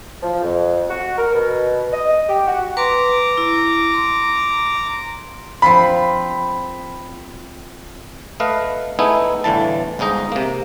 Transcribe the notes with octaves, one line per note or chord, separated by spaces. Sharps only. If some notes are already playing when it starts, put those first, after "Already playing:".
F3
F2
F#4
A#4
B2
D#5
G4
F#4
B4 A#5 C6 D6
E4
C6
F3 C4 F4 B5
A3 B4 D#5 F5
A3 B3 D#4 E4 G#4
G1 A2 D3 E3 A5
G1 G#2 G#3 D#4 D#5
C3 A#3